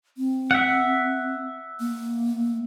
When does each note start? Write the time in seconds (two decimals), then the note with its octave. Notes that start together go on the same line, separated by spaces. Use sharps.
0.17 C4
0.51 E5 F#5
1.80 A#3